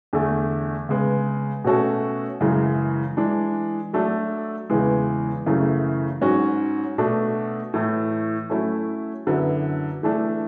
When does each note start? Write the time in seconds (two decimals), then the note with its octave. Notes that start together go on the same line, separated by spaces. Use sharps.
0.13 E2 D3 A3
0.89 C#3 G#3 B3
1.64 B2 A3 C#4 F#4 A4
2.41 F#2 C#3 E3 G#3
3.17 E3 G#3 D4
3.93 F#3 A3 D4 A4
4.70 E2 C#3 E3 G#3 B3
5.46 F#2 C#3 E3 A3
6.21 G#2 F#3 C#4 F#4
6.98 B2 A3 D4 F#4 A4
7.74 A2 E3 A3
8.50 F#3 A3 C#4 E4 A4
9.27 F#2 D3 F#3 B3 E4
10.03 E3 A3 D4 A4